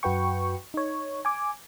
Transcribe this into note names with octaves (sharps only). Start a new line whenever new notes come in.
F#2 F#4 B4 G5 C#6
D#4 C#5
G#5 D6